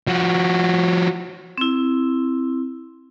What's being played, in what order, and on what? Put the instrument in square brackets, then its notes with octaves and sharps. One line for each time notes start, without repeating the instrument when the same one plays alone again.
[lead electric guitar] F3 F#4
[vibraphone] C4 E4